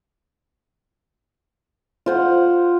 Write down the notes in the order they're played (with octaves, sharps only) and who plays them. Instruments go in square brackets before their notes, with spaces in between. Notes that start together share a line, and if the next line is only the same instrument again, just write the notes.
[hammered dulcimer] F4 C5 F#5